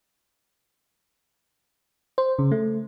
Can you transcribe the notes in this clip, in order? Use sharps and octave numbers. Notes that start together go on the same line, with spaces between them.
C5
C#3
A3